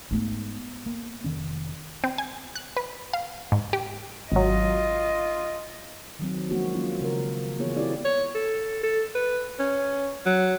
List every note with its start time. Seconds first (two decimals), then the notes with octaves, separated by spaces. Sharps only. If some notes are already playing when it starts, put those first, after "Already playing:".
0.11 G#2 A3 B3
0.86 A#3
1.24 F1 D#3 C#4
2.04 C4
2.18 G#5
2.56 F#6
2.77 B4
3.13 F5
3.52 G#2
3.73 G4
4.32 G#1 F#3 F4 D#5
6.19 D#3 F#3 C4
6.51 F3 G#3 A#3 C#4 F#4
6.73 A#3 C#4 F4
7.01 C#3 A#4
7.58 E3 A#3 B3 F4 G#4 C#5
7.76 C4 E4 F#4 G4 A4 D5
8.05 C#5
8.35 A4
8.83 A4
9.15 B4
9.60 C#4
10.26 F#3